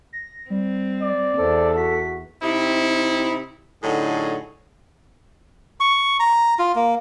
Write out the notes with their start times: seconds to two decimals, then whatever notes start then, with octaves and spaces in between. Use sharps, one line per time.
0.13 A#6
0.50 G3 C4
1.02 D5
1.38 E2 A4 C5
1.77 F#4 B6
2.42 C3 C4 D#4 E4
3.82 A2 D3 F#3 D#4 G#4
5.80 C#6
6.20 A#5
6.59 F4
6.75 A#3